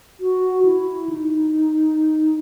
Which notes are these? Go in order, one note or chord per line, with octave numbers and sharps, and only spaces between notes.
F#4
E4
D#4